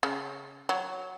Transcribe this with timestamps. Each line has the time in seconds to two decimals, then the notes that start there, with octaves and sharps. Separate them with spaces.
0.03 C#3
0.69 F#3